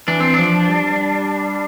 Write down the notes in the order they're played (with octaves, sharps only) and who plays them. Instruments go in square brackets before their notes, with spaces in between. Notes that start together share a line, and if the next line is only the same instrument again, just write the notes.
[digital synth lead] E3 [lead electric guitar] D4
[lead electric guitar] C4
[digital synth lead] F3 [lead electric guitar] D4
[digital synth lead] G3